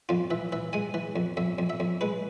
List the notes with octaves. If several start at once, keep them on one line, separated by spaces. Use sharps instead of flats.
F2 F4
E3 E5
E3 E5
G#3 G#5
E3
F2
F2 E5
F2
E5
F2
G#3 B4